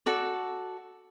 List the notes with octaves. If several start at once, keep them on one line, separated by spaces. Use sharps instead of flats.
F#4 A4 D5